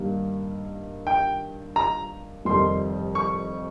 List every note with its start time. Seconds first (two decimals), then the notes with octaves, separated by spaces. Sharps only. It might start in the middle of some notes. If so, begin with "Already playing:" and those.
Already playing: G2 D#3 G3 A#3
1.07 G5
1.76 A#5
2.45 F1 F2 D#3 G3 C6
3.15 C#6